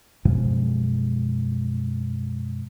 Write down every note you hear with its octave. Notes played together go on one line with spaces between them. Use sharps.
F#2 B2 F3 G#3